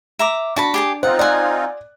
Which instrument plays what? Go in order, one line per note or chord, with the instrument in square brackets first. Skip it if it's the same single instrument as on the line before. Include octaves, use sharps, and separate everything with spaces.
[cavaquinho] E5 A#5 D6
[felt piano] D4 [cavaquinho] F#4 A5 B5
[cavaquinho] G4 G#4 A5
[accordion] C4 D#4 F4 [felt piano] C5 [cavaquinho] F#5
[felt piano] D5 F#6 [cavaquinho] F#5 G#5